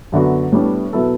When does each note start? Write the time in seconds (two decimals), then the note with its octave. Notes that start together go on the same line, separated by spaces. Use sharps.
0.12 F#2 D3 F#3 B3 F#4
0.52 A2 G3 B3 D4
0.93 B2 F#3 B3 E4 A4